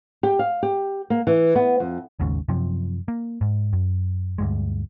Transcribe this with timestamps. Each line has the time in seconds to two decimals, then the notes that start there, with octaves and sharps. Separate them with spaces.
0.23 G4
0.39 F5
0.63 G4
1.10 A#3
1.27 E3
1.55 B3
1.80 F2
2.19 G#1 D#2 G#2 C#3
2.48 F#2 C3 F3
3.08 A#3
3.41 G#2
3.73 F#2
4.38 D2 G2 G#3